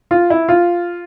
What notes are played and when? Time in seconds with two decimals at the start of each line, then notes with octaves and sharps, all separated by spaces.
0.11 F4
0.30 E4
0.49 F4